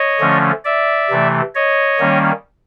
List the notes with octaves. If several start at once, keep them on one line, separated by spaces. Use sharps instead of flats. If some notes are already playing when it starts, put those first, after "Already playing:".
Already playing: C#5 D#5
D3 F3 A3 C#4
D5 E5
C3 E3 A3
C#5 D#5
D#3 G3 A#3 C#4